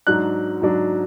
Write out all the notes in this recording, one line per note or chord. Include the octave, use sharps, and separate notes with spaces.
G#2 F#3 D4 F#6
G#2 F#3 D4